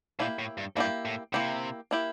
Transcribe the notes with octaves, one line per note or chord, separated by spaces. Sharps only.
A#2 A#3 E4 G4
A2
G2
G2 A#3 E4 G4
A2
C3 A#3 E4 G4
A#3 E4 G4